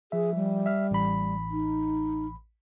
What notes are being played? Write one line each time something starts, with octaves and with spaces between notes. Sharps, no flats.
F3 G#4 E5
G3
E5 F6
A1 B5
D#4